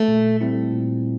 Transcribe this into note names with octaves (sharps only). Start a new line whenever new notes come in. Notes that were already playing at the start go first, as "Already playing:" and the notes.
Already playing: A3
A#2
G3 C4 E4
A#2